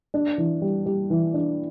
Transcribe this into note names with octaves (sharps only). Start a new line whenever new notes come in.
D4
E3
G3
G3
E3
D4